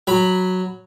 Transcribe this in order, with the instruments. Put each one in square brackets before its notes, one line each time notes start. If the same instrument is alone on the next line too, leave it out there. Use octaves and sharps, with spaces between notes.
[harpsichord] F#3 B5